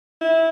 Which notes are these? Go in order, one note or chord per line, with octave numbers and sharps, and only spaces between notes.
E4